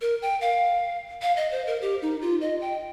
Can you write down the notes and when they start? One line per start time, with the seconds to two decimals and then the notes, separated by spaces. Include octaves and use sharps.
0.01 A#4
0.22 G5
0.41 F5
1.22 F5
1.37 D#5
1.52 C5
1.67 A#4
1.82 G4
2.02 D#4
2.22 F4
2.41 D#5
2.61 G5